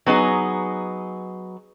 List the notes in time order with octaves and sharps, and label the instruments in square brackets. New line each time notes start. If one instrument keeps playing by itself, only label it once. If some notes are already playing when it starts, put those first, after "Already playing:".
[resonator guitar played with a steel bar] F#3 B3 D#4 G#4